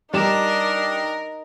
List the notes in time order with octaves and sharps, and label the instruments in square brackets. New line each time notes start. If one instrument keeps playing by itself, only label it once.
[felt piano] G3 E7 [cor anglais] D4 [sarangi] D#4 [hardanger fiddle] A#4